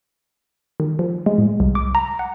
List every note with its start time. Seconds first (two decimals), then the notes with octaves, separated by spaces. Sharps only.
0.80 D#3
0.99 F3
1.26 G#3
1.38 A2
1.60 C2
1.75 D6
1.95 A#5
2.19 F#5